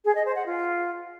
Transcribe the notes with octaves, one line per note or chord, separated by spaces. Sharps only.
G#4
D#5
C5
F#5
F4